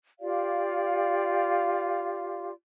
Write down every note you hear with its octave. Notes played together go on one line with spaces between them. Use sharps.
F4 G4 D5 F5